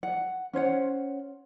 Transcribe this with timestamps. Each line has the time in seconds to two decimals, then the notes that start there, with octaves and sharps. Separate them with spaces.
0.03 F#5
0.53 C#4 C5 C#5 F#5